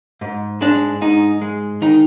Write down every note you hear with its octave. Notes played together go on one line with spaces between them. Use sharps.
G#2
G#3 D4
G#2 D#4
G#3
D#3 D#4